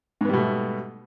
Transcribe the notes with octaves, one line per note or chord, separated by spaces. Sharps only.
G#2 B2 G3 A3 B3